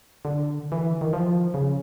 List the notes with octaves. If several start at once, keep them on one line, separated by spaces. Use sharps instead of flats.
D3
E3
D#3
F3
C#3